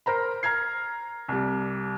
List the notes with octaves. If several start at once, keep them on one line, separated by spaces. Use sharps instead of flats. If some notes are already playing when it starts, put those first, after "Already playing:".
A#4 C5 A#5 B5
A#5 F6 G#6 C7
C2 G3